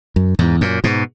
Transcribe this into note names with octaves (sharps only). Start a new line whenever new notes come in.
F#2
E2 G#2
F#2 A#2
G#2 B2